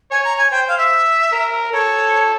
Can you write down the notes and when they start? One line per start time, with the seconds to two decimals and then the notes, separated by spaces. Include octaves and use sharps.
0.11 C#5 G#5
0.24 A#5
0.38 G#5
0.51 C5 G5
0.68 F5
0.78 E5
1.32 A#4
1.72 A4 C#5